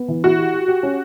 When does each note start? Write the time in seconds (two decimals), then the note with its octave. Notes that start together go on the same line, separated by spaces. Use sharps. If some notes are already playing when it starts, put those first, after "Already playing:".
Already playing: B3
0.08 E3
0.23 E4 F#4
0.38 G4
0.53 G4
0.68 G4
0.83 C#4